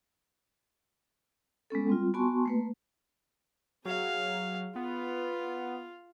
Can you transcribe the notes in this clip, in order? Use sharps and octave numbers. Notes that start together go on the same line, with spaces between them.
G#3 B3 C#4 A4
G3 C4 F4
B3 F#4 G#5 A5 C6 C#6
A3 A#3 B4
F#3 G#4 F5
B3 F4 F5